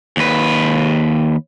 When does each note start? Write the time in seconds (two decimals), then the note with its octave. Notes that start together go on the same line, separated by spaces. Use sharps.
0.17 D#2 B4